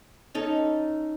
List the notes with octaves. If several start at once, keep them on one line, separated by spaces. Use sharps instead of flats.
C#4 D#4 A4